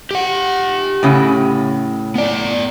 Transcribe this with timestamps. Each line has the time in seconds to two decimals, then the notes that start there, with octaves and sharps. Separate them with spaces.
0.11 G4 F#5
1.03 A2 C#3 C#4
2.15 B3 D5